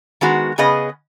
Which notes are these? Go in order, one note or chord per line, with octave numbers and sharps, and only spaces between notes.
D#3 G#3 B3 F#4
C#3 B3 G#4 B4 D#5